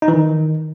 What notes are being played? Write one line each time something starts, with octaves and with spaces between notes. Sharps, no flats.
D#4
E3
D#3